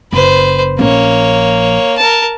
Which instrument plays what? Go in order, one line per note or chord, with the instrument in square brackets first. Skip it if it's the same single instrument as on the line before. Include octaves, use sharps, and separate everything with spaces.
[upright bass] F#1 [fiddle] B4 C5
[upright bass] A#1 C#4 [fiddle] A#3 C#5
[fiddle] A#4 A5